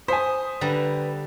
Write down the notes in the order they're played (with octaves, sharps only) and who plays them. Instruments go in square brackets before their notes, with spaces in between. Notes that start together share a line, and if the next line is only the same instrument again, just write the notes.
[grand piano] C5 [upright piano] G#5 B6 [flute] D#6
[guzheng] D3 G3 A#5 [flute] B4